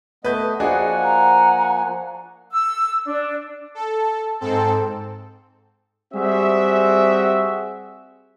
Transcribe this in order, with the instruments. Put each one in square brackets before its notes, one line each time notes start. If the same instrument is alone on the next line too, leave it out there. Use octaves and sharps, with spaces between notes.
[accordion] A3 B3 D#5 [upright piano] B4 G6
[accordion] F3 A#3 G#5 [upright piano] D4 F#4 G#4 [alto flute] D#5 [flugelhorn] F#5
[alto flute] A#5
[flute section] E6
D4
[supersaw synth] A4
G#2 C4 A4
[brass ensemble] G3 C4 F#4 G#4 E5